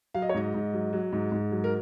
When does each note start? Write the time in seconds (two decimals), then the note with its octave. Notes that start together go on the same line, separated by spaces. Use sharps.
0.14 F#3 F5
0.22 D#5
0.29 C#5
0.34 G#2 D#5
0.54 G#2
0.73 F#3
0.93 F#3
1.12 G#2
1.32 G#2
1.52 F#3
1.64 A#4